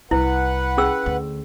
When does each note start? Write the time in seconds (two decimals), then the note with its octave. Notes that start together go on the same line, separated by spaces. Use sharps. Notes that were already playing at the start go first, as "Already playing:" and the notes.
0.11 C2 E4 B4 F#5
0.78 C#4 G#4 E6
1.06 D2